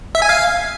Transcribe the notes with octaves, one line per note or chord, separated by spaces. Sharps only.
E5
G#5
F5